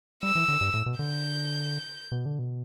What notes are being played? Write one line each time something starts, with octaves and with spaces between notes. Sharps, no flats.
G3 E6
E3
D3
G2
A2
B2
D3 G6
B2
D3
B2